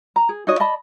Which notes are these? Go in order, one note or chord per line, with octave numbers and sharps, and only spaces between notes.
A#5
G#4
D#4 F#4 C#5 D#5
D5 D#5 A5 B5